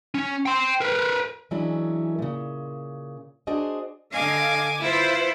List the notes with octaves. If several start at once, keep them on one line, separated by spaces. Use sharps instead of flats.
C#4
G5 C6
A#4 B4
E3 F#3 G#3 C#4 D4 E4
A#2 C#3
D4 F#4 G#4 C5 D#5
D3 D#5 F5 G#5 D6
E4 F4 B4 C5